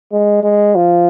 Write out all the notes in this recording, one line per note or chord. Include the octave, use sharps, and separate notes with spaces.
G#3
G#3
F3